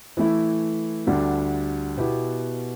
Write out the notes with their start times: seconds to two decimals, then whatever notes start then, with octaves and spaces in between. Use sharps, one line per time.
0.17 E3 A3 E4
1.07 D2 D3 G3 D4 G4
1.97 B2 B3 E4 G4